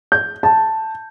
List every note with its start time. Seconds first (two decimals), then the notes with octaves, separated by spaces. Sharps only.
0.12 G6
0.43 A5